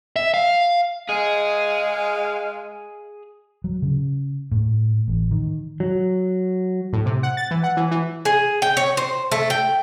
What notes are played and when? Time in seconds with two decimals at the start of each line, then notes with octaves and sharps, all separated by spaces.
0.16 E5
0.34 F5
1.09 G#3 G#4 F5
3.64 F#3
3.82 C#3
4.51 A2
5.08 A1
5.31 D#3
5.80 F#3
6.93 A2
7.06 C3
7.23 F#5
7.37 A6
7.51 E3
7.63 F#5
7.77 E3
7.91 E3
8.25 G#4
8.62 G5
8.77 C#5
8.97 C5
9.32 A3
9.50 G5